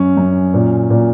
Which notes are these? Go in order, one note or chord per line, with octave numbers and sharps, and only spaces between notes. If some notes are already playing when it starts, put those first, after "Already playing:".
Already playing: F#2 C#4
F#2
A#2
A#2